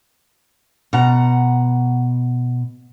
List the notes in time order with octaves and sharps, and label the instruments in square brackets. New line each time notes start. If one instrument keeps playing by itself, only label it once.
[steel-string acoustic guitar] B2 F#5 A#5